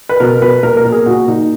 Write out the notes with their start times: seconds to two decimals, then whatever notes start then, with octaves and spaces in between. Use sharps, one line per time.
0.09 B4
0.20 B2 A#4
0.42 B2 B4
0.63 A#2 A#4
0.77 A#4
0.85 A#2
0.92 G#4
1.06 A#2 F#4
1.28 A#2 D#4